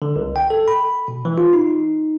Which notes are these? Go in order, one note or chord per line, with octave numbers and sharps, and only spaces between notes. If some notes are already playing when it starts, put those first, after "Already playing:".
D3
C2
G5
A4
B5
B2
E3
F4
D#4